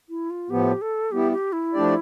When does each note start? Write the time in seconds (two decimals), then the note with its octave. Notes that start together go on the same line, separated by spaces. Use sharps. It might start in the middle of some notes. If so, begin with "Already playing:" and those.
0.09 E4
0.30 F4
0.50 A2 F3 B3 G4
0.82 A4
1.12 G3 B3 E4 G4
1.32 G4
1.53 E4
1.73 F3 A3 D4 G4 D5